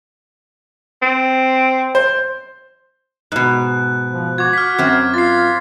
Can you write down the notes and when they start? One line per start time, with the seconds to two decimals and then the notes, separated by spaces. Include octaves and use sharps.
1.02 C4
1.95 C5
3.32 G#2 B2 F#6
4.11 F3
4.38 F#4 D6 G#6
4.53 F6 B6
4.78 F#2 C4
5.14 F4 A6 C7